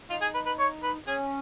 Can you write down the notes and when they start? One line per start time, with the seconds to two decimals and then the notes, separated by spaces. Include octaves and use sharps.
0.10 D#4 F4
0.21 G#4
0.34 B4
0.46 B4
0.59 C#5
0.83 B4
1.07 C#4 G#4